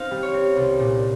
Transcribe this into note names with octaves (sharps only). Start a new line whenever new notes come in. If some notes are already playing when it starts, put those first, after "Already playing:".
Already playing: C4 D#4 F5
G3
C#5
C4
C2
A#2